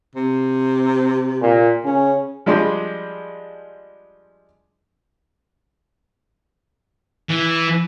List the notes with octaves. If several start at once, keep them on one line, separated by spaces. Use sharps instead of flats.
C3
A#2
C#3 C#4
F3 G3 G#3 D4 G#4 C6
E3